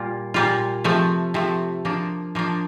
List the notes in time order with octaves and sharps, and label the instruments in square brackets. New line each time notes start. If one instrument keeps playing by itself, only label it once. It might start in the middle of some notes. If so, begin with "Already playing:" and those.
Already playing: [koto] A#2 G3 A#3 F4
A#2 G3 A#3 F4
C3 F3 A3
C3 F3 A3
F3 A#3 D4
F3 A#3 D4